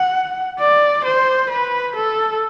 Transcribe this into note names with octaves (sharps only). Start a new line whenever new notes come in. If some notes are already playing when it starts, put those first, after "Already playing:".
Already playing: F#5
D5
C5
B4
A4